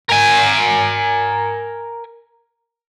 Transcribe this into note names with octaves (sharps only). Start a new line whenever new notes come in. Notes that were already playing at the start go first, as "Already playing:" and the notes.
A#4 G#5